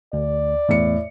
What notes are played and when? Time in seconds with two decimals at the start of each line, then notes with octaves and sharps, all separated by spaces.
0.13 D2 D5
0.69 E2 A2 C#7